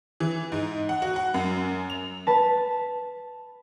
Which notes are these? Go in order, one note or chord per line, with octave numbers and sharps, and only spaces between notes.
E3
G#2
F#5
F#4
F#5
F#2
F7
B4 A5